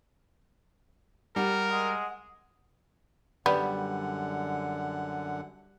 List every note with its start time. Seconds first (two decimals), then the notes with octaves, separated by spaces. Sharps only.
1.36 G3 A#4 F#5
1.71 G#3 F#5
3.46 F#2 D3 G3 B3 F#5